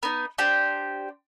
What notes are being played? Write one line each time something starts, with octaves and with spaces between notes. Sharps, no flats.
B3 D#4
D4 G4 C5